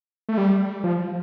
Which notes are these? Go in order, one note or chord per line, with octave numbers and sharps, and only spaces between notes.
A3
G3
F3